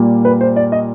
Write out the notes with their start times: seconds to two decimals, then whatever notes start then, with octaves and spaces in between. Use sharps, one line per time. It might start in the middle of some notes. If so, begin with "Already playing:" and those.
Already playing: A#2 G3 A#3
0.25 B4
0.41 C5
0.56 D5
0.72 D#5